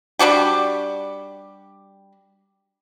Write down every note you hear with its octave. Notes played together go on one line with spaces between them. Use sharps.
G3 D4 F#4 G4